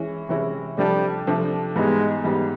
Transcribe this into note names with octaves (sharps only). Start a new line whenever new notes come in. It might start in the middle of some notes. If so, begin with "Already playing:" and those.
Already playing: E3 G#3 C#4 E4
C3 E3 G#3 C#4 E4
C3 F3 G3 A3 D4
C3 F3 A3 D4
G#2 E3 G3 G#3 B3
G#2 E3 G3 B3